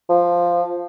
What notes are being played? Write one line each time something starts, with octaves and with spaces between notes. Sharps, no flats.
F3